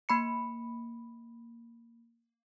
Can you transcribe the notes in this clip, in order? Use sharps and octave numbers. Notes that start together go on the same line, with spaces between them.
A#3 B5 C#7